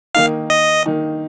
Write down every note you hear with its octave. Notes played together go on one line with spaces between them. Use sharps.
D#3 A#3 D#4 F5
D#5
D#3 A#3 D#4